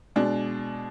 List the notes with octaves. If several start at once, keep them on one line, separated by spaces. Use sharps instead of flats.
B2 G#3 D4